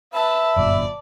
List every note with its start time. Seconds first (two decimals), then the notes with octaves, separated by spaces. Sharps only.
0.13 B4 E5 A5 B5
0.56 G1 F#2 A#2 D5